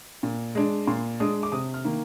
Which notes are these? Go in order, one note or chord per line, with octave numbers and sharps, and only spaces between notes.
A#2
G#3 D4
A#2 C6
G#3 D4 D#6
D6
C3 D#6
F6
D#3 A#3